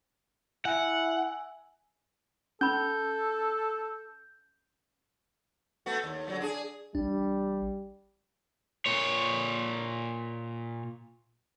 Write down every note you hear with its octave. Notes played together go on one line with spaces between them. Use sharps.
E4 E5 F#5 G#5 E6
C#4 A4 B5 G6
A3 B3 F#4
D#2
D3 F#3 A3
D4 F4 G#4
A1 G3 D4
A#2 C#5